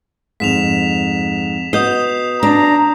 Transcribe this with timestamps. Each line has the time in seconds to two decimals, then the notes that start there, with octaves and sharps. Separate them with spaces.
0.40 F2 G#2 B6 E7 F7
1.73 B3 F#4 D#5 D#6 G6 C7
2.43 D4 A#5